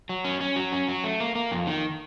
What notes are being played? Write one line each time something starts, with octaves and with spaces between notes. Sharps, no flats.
F#3
C#4
C#4
F#3
C#4
F#3
A3
A#3
A#3
F2
D#3